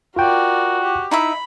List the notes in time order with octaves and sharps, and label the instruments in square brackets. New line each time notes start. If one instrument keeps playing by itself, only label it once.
[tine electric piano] F4 G5 [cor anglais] F#4 [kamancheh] A#4 D5
[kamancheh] G4
[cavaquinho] D#4 E4 E5 [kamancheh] B5